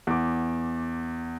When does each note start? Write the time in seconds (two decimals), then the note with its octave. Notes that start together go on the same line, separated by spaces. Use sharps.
0.07 E2 D6